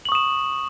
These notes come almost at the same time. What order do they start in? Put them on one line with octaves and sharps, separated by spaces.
F#7 C#6 D#6 E7